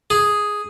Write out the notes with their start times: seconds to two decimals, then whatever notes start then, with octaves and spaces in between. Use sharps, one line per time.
0.10 G#4